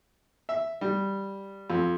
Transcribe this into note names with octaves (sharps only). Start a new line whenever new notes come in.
E5
G3
F2